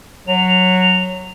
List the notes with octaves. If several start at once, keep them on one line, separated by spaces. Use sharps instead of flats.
F#3 F7